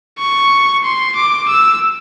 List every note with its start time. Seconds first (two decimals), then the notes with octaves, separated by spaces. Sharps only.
0.19 C#6
0.84 C6
1.16 D6
1.49 E6